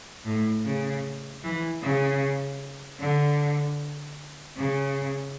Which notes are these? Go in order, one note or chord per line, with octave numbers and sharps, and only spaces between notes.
A2
C#3
E3
C#3
D3
C#3